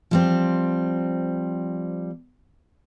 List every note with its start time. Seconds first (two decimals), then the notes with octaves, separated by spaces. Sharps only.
0.11 F3 G3 C4